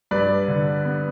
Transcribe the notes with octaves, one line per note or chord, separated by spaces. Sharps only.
G2 B4 D5
D3
B3